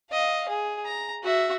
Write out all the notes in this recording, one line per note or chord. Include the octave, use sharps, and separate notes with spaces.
D#5 F5
G#4
A#5
F#4 E5